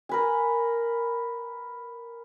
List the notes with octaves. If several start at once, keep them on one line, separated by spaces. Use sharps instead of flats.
A#4 B4 G#5